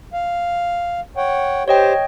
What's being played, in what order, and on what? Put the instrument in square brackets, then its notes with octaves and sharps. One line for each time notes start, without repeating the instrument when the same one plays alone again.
[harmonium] F5
C#5 F#5 G5
[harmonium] G4 C5 [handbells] C#5 D#5 G5